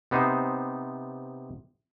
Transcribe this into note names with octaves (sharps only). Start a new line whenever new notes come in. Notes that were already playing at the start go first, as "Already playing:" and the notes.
C3 B3 D#4 C5